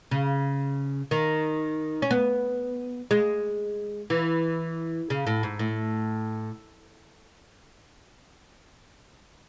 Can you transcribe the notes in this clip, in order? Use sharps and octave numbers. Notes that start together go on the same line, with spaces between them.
C#3
D#3
C#4
B3
G#3
E3
C#3
A2
G#2
A2